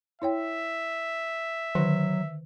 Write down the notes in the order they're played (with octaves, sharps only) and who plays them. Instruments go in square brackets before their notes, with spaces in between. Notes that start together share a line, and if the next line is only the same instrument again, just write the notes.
[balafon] E4 C#5 G5 [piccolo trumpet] E5
[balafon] D3 D#3 [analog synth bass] F#3